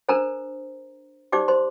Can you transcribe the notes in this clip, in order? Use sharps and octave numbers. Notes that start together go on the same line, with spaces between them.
D4 A4 A#4 C5 A#5
D#4 G4 C5 D5 D6
C5 C6